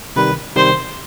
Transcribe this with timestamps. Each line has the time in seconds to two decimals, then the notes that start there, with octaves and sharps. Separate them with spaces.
0.16 C3 D#3 G3 B4
0.56 C3 D#3 G3 C5